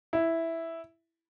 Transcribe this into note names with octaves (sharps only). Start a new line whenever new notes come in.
E4